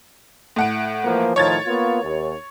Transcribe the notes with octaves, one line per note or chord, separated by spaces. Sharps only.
A2 F#5 D7
E3 F3 A#3
A2 D#3 F3 C#5 G#6 A6
A#3 B3 F4
D#2